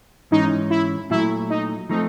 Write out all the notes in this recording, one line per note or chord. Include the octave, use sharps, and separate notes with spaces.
G#2 E3 G#3 C#4 D#4
E4
A#2 F#3 A3 E4
D#4
F3 A3 C4 D#4